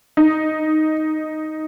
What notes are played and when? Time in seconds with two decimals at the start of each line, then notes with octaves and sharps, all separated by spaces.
0.17 D#4